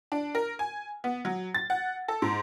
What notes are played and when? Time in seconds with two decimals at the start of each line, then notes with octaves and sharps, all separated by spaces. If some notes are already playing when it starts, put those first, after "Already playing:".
0.12 D4
0.35 A#4
0.59 G#5
1.04 B3
1.25 F#3
1.55 A6
1.70 F#5
2.08 A4
2.22 G#2